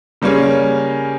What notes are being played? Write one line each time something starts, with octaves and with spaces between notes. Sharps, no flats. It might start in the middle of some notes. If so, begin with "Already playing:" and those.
C#3 G3 A#3 C#4 G#4